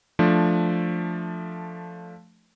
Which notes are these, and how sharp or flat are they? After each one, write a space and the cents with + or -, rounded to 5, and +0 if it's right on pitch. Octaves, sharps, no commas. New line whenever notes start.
F3 +0 A3 +0 D4 +0